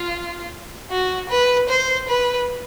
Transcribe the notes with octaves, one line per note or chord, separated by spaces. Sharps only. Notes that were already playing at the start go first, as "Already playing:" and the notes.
Already playing: F4
F#4
B4
C5
B4